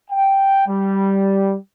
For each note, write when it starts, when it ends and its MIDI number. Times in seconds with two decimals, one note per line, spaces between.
0.11 0.67 79
0.68 1.56 55